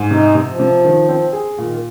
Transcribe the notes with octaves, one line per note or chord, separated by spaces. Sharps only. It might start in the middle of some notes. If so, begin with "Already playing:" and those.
Already playing: G#2
C3 D#4
C3
F3
C3
D#3
C4
G#4
A#2 D#3